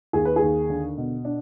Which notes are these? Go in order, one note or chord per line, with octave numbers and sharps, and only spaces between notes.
D#2 G#4
B4
G#4
D#2
D3
B2
D4